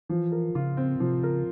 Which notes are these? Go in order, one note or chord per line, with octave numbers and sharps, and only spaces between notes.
E3 F3
A#4
C#3 F4
C4
C3 F3
C#3 A#4